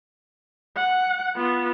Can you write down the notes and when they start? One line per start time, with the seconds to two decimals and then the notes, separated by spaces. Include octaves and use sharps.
0.77 F#5
1.36 B3 F4